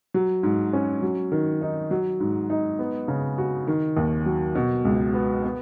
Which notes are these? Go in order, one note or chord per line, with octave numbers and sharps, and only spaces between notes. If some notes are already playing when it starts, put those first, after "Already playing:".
F#3
G#2
C#4
F#3
D#3
D#4
F#3
G#2
D#4
B3
C#3
F#4
D#3
D#2
F#3
B2
C#2
B3
B3